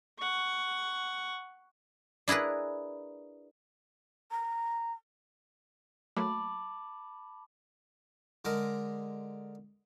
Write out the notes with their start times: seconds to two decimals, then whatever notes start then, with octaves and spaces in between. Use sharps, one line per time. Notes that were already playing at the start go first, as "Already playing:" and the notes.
0.19 F#5 C#6
2.28 D4 E4 G#4 A#4 B4
4.31 A#5
6.17 F#3 A3 A#3 A5 B5 D6
8.45 D3 G#3 A#4